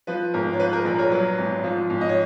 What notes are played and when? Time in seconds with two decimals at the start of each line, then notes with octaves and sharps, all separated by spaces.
0.07 F3 B4
0.34 G#1 A#4
0.53 C#5
0.60 F3 B4
0.73 A#4
0.85 A#1 B4
0.99 A#4 C#5
1.12 F#3 B4
1.38 G#1
1.64 F3
1.90 G#1
2.01 D#5
2.09 C#5